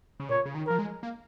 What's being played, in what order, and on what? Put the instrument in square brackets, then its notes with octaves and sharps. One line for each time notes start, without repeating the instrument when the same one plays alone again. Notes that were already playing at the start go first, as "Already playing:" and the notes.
[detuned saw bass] C#3
[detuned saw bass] A#2 [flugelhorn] C#5
[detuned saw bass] C#3
D#3
[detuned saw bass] F3 [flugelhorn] A#4
[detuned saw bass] G#3
A#3